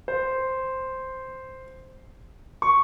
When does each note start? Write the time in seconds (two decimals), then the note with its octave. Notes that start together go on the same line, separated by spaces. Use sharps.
0.08 C5
2.62 C#6